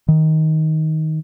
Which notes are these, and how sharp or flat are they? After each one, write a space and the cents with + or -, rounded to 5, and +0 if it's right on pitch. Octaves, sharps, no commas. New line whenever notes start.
D#3 +15